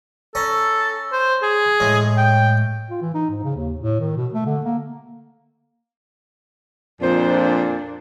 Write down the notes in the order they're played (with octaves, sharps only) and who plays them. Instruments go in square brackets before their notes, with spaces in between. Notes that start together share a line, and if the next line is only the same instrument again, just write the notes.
[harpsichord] C#4 A#5 [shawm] A4
[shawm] C5
G#4
[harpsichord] A2 G#3
[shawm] G5
[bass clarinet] F4
E3
D#4
G#2
C#3
D#2
A2
D#3
B2
A3
D3
A#3
[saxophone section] F2 C5 [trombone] A#2 [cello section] D4